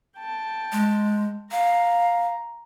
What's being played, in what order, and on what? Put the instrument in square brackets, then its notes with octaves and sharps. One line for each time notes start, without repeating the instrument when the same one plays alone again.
[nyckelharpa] G5 A5
[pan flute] G#3
[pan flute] F5 [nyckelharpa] A#5